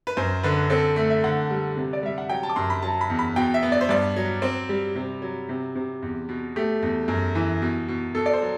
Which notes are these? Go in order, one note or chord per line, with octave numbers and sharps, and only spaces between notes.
B4
F#2 C5
D3 B4
C4 A4
A3
E5
D3 F#5
G3
C3
D5
G3 E5
F#5
F#3 G5
A5
D6
F#2 C6
B5
F#3 A5
B5
E2
B5
B2 G5
E5
B3
D5
C5
G2 D5
F#3
C4 C5
G3
C3
F#3
C3
C3
E2
B2
A3 G4
E2
F#2
E3
B2
B2
B2 A4
D5
C5
F#3